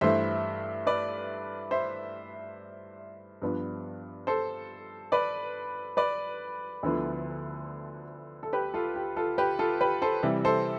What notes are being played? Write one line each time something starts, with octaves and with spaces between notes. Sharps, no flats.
G2 E3 A3 E4 C5 E5
B4 D5
C5 E5
G2 F3 B3 D4
A4 C5
B4 D5
B4 D5
D2 D3 F3 B3 E4
A4
G4 B4
F4 A4
G4
F4 A4
G4 B4
F4 A4
G4 B4
A4 C5
C3 E3 G3
A4 C5